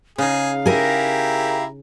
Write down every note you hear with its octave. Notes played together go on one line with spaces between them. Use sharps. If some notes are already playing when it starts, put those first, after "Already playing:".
C#3 D#4 G#4 F5
E4 G4 G#4 A#4 A#5